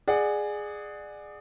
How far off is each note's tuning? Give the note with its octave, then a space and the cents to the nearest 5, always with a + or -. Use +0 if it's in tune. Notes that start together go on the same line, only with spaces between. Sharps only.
G#4 +0 D5 +25 F#5 +0